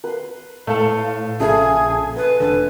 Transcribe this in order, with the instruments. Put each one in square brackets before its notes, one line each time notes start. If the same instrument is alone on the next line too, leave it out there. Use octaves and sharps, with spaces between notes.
[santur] B4 C6
[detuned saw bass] A2 [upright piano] A3 A4 [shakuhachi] F5
[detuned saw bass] A#1 [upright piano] C#3 [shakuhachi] G#4 [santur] A4 E5 G#5
[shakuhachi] B4 [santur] C6
[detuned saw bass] F1 [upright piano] D3 [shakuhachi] B4